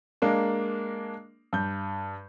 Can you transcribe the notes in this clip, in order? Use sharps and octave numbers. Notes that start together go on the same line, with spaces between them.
G#3 A#3 D4
G2 G6